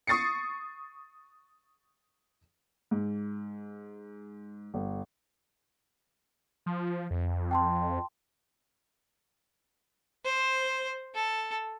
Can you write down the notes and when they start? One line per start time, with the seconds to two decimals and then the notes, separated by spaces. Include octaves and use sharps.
0.07 C#6 D#6 A6 C7 C#7
2.91 G#2
4.74 G1
6.66 F3
7.11 F2
7.51 G5 A5 C6
10.25 C5
11.15 A4